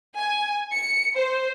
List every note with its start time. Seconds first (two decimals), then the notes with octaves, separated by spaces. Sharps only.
0.16 G#5
0.73 C#7
1.16 C5